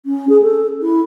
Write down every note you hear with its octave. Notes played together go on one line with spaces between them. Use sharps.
C#4
G#4
A4
E4